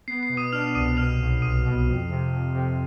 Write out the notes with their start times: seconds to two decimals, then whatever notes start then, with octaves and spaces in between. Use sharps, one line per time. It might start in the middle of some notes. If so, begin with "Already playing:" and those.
0.08 B3 C7
0.23 C7
0.29 B2
0.37 D#6 D#7
0.52 D4 F6 F7
0.75 C2 D#6 D#7
0.97 B2 F6 F7
1.20 B1
1.42 B1 D#6 D#7
1.65 B2
1.87 F2
2.09 C3
2.32 F2
2.54 C3